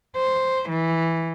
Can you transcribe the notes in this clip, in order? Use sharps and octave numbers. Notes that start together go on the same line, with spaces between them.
C5
E3